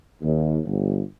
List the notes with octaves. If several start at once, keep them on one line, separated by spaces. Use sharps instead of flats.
D#2
G1